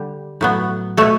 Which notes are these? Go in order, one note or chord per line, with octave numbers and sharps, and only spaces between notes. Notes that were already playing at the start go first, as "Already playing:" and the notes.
Already playing: D3 G3 G4
A2 F#3 B3
B2 A3 A4 C#5